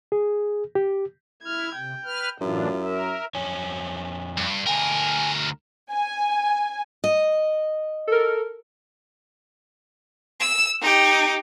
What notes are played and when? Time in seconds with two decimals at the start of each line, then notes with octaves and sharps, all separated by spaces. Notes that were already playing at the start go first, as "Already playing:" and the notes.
0.12 G#4
0.75 G4
1.43 E4 F6 G#6
1.75 C3 G5
2.05 B4 F6
2.41 F#2 A2 E3 D4 E4 F4
2.85 A#4 E5
3.35 F2 C#5 G#5
4.38 G2
4.67 D2 A#4 G5 G#5
5.91 G#5
7.04 D#5
8.07 A4 A#4
10.40 E6
10.82 D#4 G4